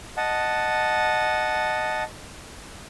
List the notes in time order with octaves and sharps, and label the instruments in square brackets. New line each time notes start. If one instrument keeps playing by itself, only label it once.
[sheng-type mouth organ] D#5 F#5 A5